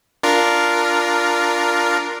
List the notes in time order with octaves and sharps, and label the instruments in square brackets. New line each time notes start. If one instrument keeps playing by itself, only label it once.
[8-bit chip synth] D4 F4 A#4